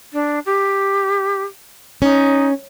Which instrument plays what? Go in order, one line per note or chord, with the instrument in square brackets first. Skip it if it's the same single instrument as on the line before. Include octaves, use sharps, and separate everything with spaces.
[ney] D4
G4
[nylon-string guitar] C#4 [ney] D#4